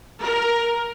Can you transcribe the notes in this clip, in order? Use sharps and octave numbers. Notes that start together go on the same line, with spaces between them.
A#4